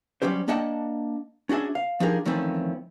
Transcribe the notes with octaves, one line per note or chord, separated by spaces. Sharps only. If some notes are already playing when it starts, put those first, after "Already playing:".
F#3 G3 C#4 G4 C5
A#3 D4 D#5 F#5 G5 A5
C#4 D4 F#4 G#4 E5
F5
F3 D4 D#4 G4 G#4 A#4
F2 D#3 E3 A3 C4 C#4